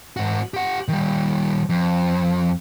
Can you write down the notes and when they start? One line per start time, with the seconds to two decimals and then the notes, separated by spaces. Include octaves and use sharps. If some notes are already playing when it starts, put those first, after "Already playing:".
0.17 G#2 F#4
0.54 G4 F#5
0.88 D#3 G3
1.69 F2